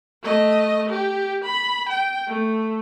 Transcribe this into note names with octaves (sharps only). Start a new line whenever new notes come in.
A3 D#5
G4
B5
G5
A3